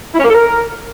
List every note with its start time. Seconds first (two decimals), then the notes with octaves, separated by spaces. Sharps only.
0.14 E4
0.19 C#4
0.24 A#3
0.29 A4
0.35 A#4